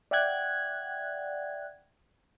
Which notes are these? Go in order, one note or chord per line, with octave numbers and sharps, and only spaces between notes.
D5 E5 F#5 G5 F#6 G#6